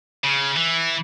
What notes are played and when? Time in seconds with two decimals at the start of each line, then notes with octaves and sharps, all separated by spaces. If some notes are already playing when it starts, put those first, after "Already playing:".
0.24 C#3
0.57 E3